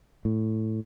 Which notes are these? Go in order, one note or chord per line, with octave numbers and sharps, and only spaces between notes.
A2